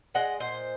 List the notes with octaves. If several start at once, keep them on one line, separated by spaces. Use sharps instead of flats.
G#3 D#5 F#5
A#2 C5 D#5